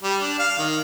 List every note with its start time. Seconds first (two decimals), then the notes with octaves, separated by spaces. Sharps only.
0.03 G3
0.21 D4
0.39 F5
0.58 D#3